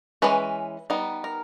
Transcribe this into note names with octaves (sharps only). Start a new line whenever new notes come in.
E3 G#3 C#4 B4
G3 B3 D#4
A#4